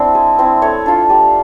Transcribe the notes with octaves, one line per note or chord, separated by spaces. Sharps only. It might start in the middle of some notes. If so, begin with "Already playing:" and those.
Already playing: C4 D4 E4 D5
G#3
C4 E4
A3 C#5
D4 F4
G3